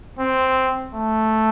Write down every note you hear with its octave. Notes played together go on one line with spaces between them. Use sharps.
C4
A3